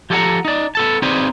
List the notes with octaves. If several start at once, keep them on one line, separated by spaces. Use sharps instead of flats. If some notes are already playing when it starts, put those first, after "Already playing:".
F3 G4 A4 C#5 F#5 A#5
D#4 D5
B3 A4 A5
C4 D#4 G#4 B4 C5 D5